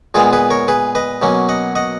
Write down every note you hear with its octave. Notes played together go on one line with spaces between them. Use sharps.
A#2 G#3 B3 F4 G#4
G#4 B4
A#4 C#5
G#4 B4
B4 D#5
B2 F#3 A#3 C#4
D#5 F#5
D#5 F#5